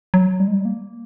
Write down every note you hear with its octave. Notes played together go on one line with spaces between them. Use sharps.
F#3
G3
G#3
G3
A#3